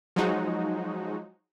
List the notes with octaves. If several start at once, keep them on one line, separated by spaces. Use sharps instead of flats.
F3 F#3 G#3 D#4 F#4